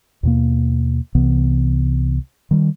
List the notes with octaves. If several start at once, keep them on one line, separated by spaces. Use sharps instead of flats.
D#2 B2 A#3
C2 C3 E3 B3
D#3 G3